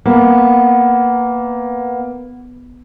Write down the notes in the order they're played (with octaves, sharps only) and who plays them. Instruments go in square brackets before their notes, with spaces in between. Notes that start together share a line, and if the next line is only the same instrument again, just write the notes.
[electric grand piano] A#3 [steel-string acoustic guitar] B3